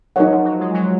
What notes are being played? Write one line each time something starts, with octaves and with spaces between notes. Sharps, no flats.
F#3 D#4 A#4 C#5 F#5
F3
F#3
G#3
F#3